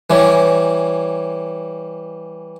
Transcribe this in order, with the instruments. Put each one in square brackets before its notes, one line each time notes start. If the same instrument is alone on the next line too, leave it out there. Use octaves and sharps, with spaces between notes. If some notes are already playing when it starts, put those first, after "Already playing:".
[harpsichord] E3 G3 C#4